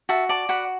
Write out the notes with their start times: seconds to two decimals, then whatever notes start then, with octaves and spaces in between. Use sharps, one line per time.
0.09 F#4 E5 A5
0.29 D5 A5 D6
0.49 F#4 F#5 B5